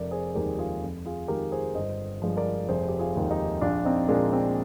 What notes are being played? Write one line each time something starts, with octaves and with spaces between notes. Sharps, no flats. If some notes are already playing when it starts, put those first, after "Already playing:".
Already playing: F1 A#4 D5
G#4 C5
D#2 D#3 G#3 G4 A#4
F4 G#4
F2
F4 G#4
D#3 G#3 G4 A#4
G#4 C5
G1 C5 D#5
G2 F3 G#3
A#4 D5
F1 G#4 C5
G4
F4 G#4
D#2 D#3 G#3
D#4 G4
A#1 D4 F4
C4 D#4
A#2 G#3 A#3 D4
C4